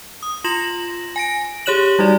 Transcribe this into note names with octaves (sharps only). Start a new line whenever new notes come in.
D#6
F4 C6 A#6 E7 F#7
G#5 A#6 D7
G4 G#4 C#5 F#6 E7 F#7
G3 D#4 F#4 D5